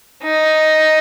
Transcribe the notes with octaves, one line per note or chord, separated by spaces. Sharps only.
D#4